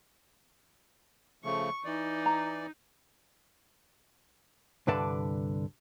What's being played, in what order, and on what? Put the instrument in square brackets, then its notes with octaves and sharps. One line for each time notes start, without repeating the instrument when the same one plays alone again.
[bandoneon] C#3 F3 A3 [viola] C#6
[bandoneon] E3 D5 [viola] D#4
[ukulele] A#5
[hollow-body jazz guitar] C2 G2 D3 B4 D5 A5